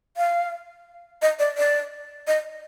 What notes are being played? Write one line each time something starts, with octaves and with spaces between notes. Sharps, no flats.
F5
D#5
D5
D5
D#5